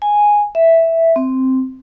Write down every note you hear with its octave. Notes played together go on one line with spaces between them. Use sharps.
G#5
E5
C4